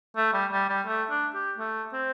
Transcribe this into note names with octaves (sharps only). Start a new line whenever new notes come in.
A3
G3
G3
G3
A3
D4
G4
A3
C4